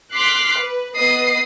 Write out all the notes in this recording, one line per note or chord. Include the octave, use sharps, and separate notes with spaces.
C6 D6 F6 F#6 B6 C7
B4
B3 B4 D#5 D#6 C7